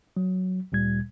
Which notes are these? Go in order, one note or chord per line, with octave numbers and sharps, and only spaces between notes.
F#3
D2 A#2 G3 G#6